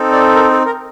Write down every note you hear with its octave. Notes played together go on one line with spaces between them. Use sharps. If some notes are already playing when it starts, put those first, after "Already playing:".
Already playing: C4 D#4 A4
D5
A#4
A4
A#4